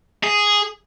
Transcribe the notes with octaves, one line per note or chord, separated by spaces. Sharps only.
G#4